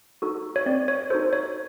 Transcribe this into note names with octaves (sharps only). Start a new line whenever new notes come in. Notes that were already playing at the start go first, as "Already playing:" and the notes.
D#4 F#4 A4
C#5
C4 D5
C#5
D#4 F#4 A4 C5
C#5